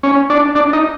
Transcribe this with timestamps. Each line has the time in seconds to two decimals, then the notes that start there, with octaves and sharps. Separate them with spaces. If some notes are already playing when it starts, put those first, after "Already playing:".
0.03 C#4
0.30 D4
0.55 D4
0.73 D#4